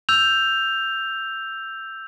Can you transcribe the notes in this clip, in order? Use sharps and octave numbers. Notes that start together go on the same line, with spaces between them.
E6 G6 F7